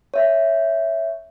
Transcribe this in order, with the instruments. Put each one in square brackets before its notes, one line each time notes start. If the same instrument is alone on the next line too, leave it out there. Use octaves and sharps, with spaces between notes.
[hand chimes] C#5 E5